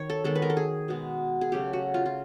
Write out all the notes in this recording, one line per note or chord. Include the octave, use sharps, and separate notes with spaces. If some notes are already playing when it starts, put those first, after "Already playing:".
Already playing: D#3 C#5
A4
D#3 G#3 B3 A4
B4
A#4
A4
G#4
B2 G#3 B3
G#4
C#3 F#3 A3 G4
F#4
F4
F4